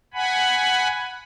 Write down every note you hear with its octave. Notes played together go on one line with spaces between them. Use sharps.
F#5 G#5 B5